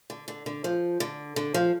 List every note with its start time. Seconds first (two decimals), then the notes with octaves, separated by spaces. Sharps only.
0.10 D3
0.28 D3
0.46 D3
0.64 F3
1.00 D3
1.36 D3
1.54 F3